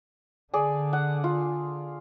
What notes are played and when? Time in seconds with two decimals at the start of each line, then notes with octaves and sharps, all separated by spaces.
0.54 D3 G#4 D5
0.93 F#5
1.24 F4